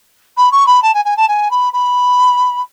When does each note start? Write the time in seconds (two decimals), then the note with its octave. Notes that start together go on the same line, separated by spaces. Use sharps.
0.37 B5
0.52 C#6
0.67 B5
0.82 A5
0.94 G#5
1.05 G#5
1.17 A5
1.28 G#5
1.51 B5
1.73 B5